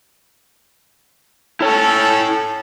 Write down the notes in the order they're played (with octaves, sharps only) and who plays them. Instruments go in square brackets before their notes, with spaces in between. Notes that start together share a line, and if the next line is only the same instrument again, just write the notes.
[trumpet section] C#4 A4 [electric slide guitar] E4 C#5